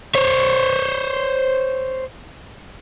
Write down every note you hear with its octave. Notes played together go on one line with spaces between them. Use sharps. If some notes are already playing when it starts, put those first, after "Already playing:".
C5 C#5